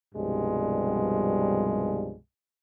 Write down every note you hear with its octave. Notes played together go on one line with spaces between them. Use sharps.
C2 G2 B2 F3 G3 G#3